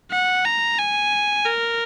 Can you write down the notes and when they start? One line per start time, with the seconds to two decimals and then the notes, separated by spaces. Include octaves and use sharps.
0.11 F#5
0.45 A#5
0.78 G#5
1.45 A#4